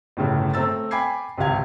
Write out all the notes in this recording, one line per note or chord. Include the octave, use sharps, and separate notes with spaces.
G1 A2 C#3
A3 C4 A#5 E6 A6
G5 G#5 B5 D6 G#6 C7
G#1 C#2 C3 F5 G#6